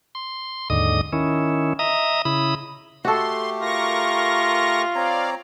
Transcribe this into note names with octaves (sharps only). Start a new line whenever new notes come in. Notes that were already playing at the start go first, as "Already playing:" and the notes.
C6
D#2 G#2 D3 D#5 D#6
D#3 C#4 E4
D#5 E5 A#5 D#6
C#3 E4 B5 D#6
A3 F#4 G4 A4 C6
F4 A#4 C#6 A#6
C4 C#5 D5 F5 A#5